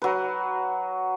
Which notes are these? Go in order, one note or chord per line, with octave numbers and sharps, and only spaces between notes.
F#3 B4